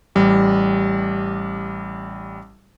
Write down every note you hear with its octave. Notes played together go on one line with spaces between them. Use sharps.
A1 G3